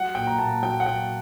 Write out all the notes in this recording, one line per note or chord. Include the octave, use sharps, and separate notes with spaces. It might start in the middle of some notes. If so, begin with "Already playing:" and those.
Already playing: F#3 F#5
A#2 G5
A#5
A#2 A5
F#3 G5
F#5
F#3 G5